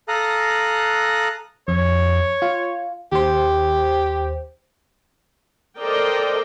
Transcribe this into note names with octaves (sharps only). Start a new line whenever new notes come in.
A4 F5 A#5 D#6 F#6
F2 C#5
F4
D#2 G4 C5
A4 A#4 C5 D5 D#5 G5